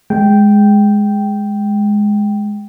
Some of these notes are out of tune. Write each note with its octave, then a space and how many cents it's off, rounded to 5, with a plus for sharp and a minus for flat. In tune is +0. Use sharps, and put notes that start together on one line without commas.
G#3 +0 G5 -5